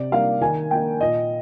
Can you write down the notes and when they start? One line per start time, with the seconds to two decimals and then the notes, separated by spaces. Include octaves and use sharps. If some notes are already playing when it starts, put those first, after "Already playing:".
Already playing: C3 D5
0.12 G3 A#3 D#4 F5
0.41 D#3 G#5
0.71 A#3 D#4 G5
1.01 A#2 D#5